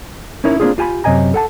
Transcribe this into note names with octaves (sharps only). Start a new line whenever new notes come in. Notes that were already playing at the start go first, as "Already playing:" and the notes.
C#4 D#4 E4 A#4 C#5
A#3 C4 D4 F4 G#4
F4 G4 G#5 A#5 B5
F#2 C3 D#5 G#5 A#5
A4 F#5 A5